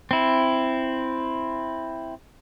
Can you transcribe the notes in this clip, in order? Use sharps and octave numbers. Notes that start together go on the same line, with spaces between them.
C4 E4